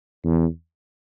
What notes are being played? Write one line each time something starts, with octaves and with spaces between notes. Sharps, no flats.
E2